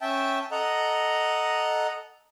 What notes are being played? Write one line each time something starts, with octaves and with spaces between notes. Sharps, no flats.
C#4 E5 G5 A5
A4 D#5 F#5 A#5